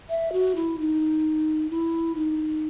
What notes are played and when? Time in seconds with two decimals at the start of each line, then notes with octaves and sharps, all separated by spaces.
0.10 E5
0.33 F#4
0.56 E4
0.79 D#4
1.70 E4
2.15 D#4